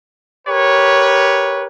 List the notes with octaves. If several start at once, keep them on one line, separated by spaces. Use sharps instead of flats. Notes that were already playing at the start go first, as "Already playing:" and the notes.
G4 A#4 B4 C#5